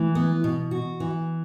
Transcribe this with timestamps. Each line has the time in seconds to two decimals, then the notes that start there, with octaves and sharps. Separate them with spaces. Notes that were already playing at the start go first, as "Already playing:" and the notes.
Already playing: E3 A3
0.15 B3
0.44 B2
0.71 F#4
1.00 E3